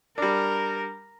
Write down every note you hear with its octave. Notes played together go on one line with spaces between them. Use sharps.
G3 D4 A#4